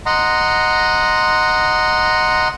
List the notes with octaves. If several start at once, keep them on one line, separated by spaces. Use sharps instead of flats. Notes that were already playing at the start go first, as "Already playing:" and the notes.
D#5 F#5 A#5 C6